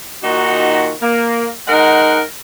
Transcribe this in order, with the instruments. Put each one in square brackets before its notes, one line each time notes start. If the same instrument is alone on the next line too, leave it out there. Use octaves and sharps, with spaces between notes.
[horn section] A#2 D#3 D#4 F#4
A#3
G#3 D#4 A#4 F#5